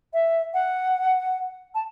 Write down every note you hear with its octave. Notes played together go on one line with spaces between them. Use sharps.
E5
F#5
A5